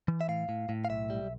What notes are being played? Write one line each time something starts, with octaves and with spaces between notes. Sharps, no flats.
E3
E5
A2 F5
A2
A2
F5
B1 E5
G3